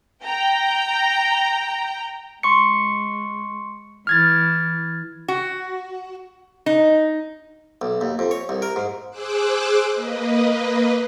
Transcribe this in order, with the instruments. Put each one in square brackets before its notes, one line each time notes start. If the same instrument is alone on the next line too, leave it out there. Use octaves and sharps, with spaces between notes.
[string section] G5 A#5
[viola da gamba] G#3 [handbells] C6 C#6 C#7
[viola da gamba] E3 [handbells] F6 G#6 A6
[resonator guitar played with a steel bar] F#4
D#4
[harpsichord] B1
D#2
F2
C#5
C2
A#4
G#2
[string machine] G#4 C5 D6 E6 F#6
A#3 B4 D#5